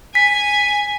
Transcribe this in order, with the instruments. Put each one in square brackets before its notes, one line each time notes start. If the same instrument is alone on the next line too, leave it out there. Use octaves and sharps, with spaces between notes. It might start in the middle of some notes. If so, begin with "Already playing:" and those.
[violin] G#5 [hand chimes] B6